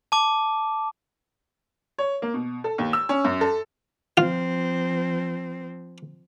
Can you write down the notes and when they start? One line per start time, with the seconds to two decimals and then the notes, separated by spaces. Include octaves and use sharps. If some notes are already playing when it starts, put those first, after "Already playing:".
0.12 A5 D6
1.98 C#5
2.22 A#3
2.34 B2
2.64 A4
2.78 D#2
2.93 E6
3.09 C#4
3.24 F#2
3.41 A4
4.17 F3 C4 F4